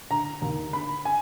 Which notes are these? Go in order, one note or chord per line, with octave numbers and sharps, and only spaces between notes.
D3 A#5
D#2
D3 B5
G#5